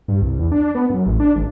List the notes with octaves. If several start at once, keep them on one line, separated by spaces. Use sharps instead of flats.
G2
C2
E2
D4
B3
F#2
A1
D4
G#1